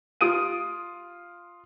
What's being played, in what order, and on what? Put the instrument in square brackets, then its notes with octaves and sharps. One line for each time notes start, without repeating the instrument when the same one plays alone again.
[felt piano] F4 D#6 D7 D#7